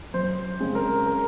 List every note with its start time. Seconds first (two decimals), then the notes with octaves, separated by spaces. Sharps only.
0.14 F#2 C5
0.60 C#3 G#3 C4
0.75 A#4
1.06 A#4